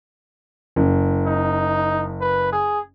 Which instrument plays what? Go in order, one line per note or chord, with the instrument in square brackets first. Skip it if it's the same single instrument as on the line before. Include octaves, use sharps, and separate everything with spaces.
[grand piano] F#1
[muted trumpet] D#4
B4
G#4